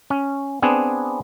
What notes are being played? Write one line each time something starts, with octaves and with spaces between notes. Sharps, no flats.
C#4
B3 C4 D4 G#4